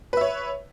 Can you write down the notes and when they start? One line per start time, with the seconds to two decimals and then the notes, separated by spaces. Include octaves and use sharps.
0.13 B4
0.17 E5
0.21 C#5